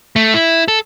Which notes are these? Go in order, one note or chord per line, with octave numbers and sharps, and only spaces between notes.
A3
E4
A4